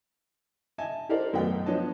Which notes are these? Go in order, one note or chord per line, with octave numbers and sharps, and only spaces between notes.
D#5 E5 G#5 A5
E4 G4 A4 A#4 C5 D5
G#1 F#2 B2 A3 B4 G5
F3 B3 D4 C#5 D#5 A5